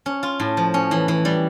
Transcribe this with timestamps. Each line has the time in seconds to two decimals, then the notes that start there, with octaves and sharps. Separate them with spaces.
0.06 C#4
0.23 F4
0.40 A2
0.57 F3
0.74 C#4
0.91 E3
1.08 E3
1.25 G3